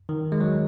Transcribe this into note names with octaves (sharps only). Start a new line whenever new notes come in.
D#3
G#3
F#3